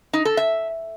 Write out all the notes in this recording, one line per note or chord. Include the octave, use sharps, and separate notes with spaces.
D#4
A4
E5